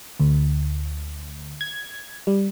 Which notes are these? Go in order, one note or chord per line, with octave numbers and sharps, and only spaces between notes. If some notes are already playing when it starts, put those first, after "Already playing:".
D2
G#6
G3